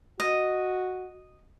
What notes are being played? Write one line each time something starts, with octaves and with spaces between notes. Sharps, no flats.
F#4 D#5